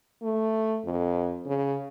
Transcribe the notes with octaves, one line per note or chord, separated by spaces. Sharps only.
A3
F2
C#3